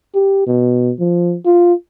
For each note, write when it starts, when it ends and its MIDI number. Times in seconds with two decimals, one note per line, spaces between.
0.15 0.47 67
0.47 0.92 47
1.00 1.36 53
1.46 1.73 65